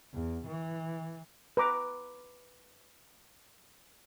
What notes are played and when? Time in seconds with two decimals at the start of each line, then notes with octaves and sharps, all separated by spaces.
0.13 E2
0.47 E3
1.57 B4 A#5 D6